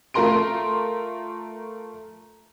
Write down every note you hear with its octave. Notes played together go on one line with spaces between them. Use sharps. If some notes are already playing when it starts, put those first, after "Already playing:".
A3 F4 A#4 A#5 C6 D7